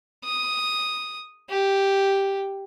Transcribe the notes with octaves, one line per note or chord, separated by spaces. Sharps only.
D#6
G4